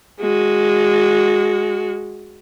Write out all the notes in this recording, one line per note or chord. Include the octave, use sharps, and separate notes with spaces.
G#3 F#4